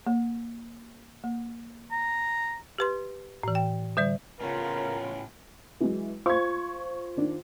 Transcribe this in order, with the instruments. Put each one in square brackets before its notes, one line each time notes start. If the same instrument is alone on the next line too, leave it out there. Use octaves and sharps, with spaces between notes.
[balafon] A#3
A#3
[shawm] A#5
[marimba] G4 B4 C6
A2 E3
G5
D3 G3 D5
[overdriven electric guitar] A2 C#4 [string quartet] C#3 B3 [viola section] F4 [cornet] A#4
[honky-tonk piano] E3 F#3 G#3
[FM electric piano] F4 C5 [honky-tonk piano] C#6 G#6
[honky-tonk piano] D#3 D4